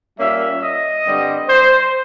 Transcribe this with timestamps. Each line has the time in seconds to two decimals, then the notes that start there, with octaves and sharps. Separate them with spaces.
0.19 A#2 G3 A#3 C#4 E5
0.63 D#5
1.04 G2 D3 G3 C4
1.49 C5